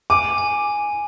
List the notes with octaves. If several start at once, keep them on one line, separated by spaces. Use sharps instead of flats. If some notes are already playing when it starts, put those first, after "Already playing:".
G#5 D6
G#5